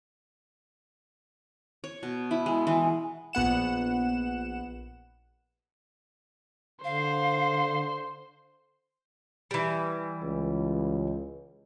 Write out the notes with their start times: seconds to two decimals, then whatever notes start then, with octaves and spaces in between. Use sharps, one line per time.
1.84 C#5
2.03 B2
2.31 E4
2.46 G#3
2.67 E3
3.33 A#1 B3 F#5 E7
6.84 D3 C5 F5
9.51 E3 G3
10.23 C#2